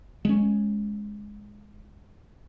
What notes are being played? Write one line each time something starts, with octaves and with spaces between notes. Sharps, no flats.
G#3 C#4